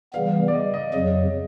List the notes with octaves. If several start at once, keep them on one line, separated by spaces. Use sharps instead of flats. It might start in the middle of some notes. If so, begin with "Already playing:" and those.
C#3 E3 G3 B3 F5
D5
D#5
D#5
F2 C#3 F#3 D#5